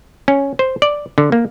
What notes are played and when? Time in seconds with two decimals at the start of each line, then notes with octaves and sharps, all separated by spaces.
0.28 C#4
0.59 C5
0.82 D5
1.18 D3
1.32 A#3